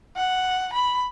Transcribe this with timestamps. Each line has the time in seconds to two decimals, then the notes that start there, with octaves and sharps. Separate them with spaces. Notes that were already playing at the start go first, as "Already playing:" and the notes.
0.17 F#5
0.73 B5